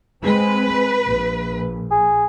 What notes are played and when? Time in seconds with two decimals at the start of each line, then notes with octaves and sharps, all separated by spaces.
0.23 G#3 C4 B4
1.05 A#1
1.91 G#4